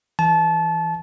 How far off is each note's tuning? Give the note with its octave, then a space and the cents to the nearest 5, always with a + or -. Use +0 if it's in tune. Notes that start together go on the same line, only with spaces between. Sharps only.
E3 +0 A5 -25